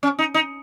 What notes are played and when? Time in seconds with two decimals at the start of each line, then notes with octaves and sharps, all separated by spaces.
0.03 C#4
0.19 D#4
0.34 D#4